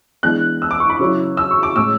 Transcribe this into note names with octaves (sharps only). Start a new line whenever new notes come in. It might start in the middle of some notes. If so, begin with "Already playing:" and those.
E3 G#3 B3 D4 F#6
E6
D6
C#6
B5
C#3 F#3 C#4 E4
E6
C#6
D6
A2 G#3 C#4 E6